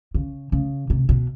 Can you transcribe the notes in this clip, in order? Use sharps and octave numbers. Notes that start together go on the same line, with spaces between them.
C#3
C#3
C3
B2